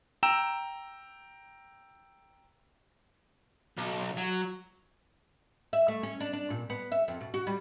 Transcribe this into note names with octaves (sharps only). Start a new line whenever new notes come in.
G5 A#5 E6 E7
B1
F#3
E5
A3
C#4
D4
D4
A#2
B3
E5
F2
B2
F#4
G3